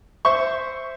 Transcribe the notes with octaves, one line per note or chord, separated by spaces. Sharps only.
C5 E5 C#6